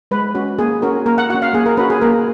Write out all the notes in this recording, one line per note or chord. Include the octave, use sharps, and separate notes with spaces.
G#3 B4
C#4 F#4
A#3 G#4
C#4 F#4 A#4
A#3 A#4
F#5
C#4 F#4 F#5
F5
A#3 G#4
A#4
C#4 F#4 B4
G#4
A#3 A#4